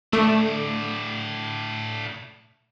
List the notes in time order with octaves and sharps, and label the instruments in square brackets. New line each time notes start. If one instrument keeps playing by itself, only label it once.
[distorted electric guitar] A2 D4 [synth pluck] A3